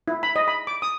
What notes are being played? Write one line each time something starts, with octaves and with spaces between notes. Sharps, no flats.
E4
B5
D#5
B5
D6
D#6